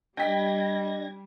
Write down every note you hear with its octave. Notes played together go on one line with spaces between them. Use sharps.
G3 D4 D#5 G5 G#6 A#6 B6